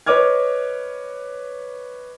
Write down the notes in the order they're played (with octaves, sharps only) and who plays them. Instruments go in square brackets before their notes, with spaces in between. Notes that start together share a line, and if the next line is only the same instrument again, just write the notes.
[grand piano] B4 C#5 D#5 D6 F6 G#6